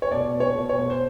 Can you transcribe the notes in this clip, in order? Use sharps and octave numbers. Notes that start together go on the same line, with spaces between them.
C#5
B2 D5
B2
C#5
B2
C#5
B2
C5